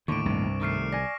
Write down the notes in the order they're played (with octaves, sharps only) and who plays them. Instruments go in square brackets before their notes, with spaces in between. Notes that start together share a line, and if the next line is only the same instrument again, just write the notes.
[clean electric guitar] D#2 A2 [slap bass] D3 [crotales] C#6 D6 D7
[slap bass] C2 C3 [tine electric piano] G2
[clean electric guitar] D#3 A3 [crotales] C#6 F6 C7
[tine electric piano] D5 G#5 [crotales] A#6